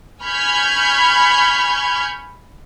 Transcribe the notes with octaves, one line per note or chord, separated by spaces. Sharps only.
G#5 B5 C#6 F6 G6 G#6